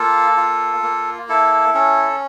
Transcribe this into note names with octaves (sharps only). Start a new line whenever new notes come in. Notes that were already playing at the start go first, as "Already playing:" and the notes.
Already playing: A#3 F4 A4
F4
A#3
E4 A4
C#4 A4